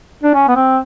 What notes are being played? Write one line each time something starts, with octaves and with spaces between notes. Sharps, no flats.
D4
C#4
B3
C4